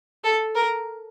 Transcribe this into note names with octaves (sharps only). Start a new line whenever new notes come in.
A4
A#4